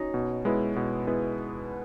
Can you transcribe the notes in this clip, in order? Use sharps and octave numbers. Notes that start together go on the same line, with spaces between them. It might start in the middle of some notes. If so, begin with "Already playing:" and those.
Already playing: C#4 D#4 F#4
B2
G#3 B3 E4 B4
B2
G#3 B3 E4 B4